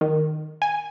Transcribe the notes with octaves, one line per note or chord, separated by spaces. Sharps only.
D#3
G#5